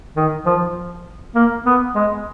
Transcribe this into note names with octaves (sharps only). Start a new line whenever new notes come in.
D#3
F3
A#3
B3
G#3